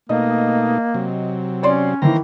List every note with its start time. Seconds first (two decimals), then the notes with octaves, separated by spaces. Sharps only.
0.09 B2 A3 A#3 D#4 D#5
0.94 C3 F#3
1.63 C#4 C#5 D5 C6
2.02 D#3 E3 A#3 C5 A#5